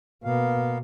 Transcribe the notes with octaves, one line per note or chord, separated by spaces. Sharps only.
B2 A#3 B3 F5